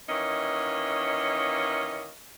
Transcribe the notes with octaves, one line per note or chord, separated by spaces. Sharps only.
D#3 E3 A#3 C#4 D#5